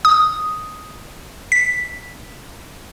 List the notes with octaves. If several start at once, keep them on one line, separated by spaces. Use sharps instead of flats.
D#6
B6